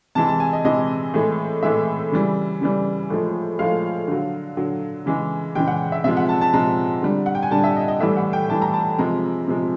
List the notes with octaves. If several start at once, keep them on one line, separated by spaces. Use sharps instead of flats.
C3 E3 G#3 A5
A5
G#5
D#5
C3 E3 G#3 D#5
A2 E3 G#3
A2 E3 G#3 E5
C#3 E3 G3
C#3 E3 G3
A2 F3 G#3
A2 F3 G#3 F5
D3 F#3
D3 F#3
C#3 E3 G#3
C#3 E3 G#3 G5
F#5
E5
C3 F3 G#3 E5
F#5
A5
A5
C3 F3 G#3 A#5
D3 G3
F#5
G5
G#5
D3 G3 A5
E5
D#5
D#5
A2 E3 G3 E5
F#5
G5
A2 E3 G3 A5
A#5
A5
C3 F3 G#3 A#5
C3 F3 G#3